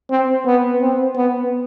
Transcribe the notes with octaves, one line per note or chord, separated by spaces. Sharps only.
C4
B3
C4
B3